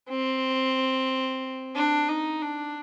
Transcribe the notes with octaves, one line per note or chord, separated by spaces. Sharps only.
C4
D4
D#4
D4